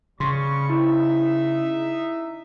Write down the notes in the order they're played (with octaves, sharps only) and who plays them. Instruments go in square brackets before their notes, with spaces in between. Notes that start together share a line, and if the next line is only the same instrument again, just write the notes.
[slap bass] C#3 [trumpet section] G3 B4 C#6 [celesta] C6
[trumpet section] D#4 E5 [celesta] E4